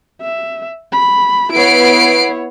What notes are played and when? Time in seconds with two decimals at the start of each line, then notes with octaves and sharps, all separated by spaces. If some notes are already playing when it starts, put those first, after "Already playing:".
0.22 E5
0.92 B5
1.52 B3 E4 C#5 C7 D7